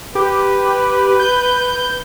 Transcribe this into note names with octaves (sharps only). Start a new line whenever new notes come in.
G4 B4
G6